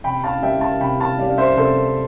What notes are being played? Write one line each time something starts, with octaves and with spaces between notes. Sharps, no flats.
C3 G5 B5
F5 A5
G3 E5 G5
F5 A5
C3 G5 B5
F5 A5
G3 D5 F5
F5
C5 E5
C3 A4 C5